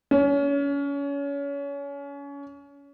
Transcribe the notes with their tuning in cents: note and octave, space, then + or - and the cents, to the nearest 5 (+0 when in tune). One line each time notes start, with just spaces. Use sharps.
C#4 +30